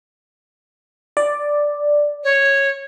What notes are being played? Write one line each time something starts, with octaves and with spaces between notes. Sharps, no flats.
D5
C#5